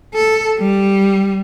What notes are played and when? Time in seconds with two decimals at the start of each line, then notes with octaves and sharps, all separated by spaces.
0.15 A4
0.58 G3